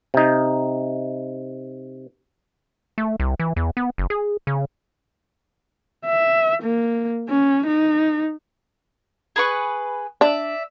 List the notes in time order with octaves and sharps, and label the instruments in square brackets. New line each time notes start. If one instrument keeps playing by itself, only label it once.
[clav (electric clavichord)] C3 D#4
[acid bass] A3
C2
E3
E2
B3
F#1
G#4
C#3
[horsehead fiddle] E5
A#3
C#4
D#4
[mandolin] G#4 B4 C#6
[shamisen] D4 [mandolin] D5 E5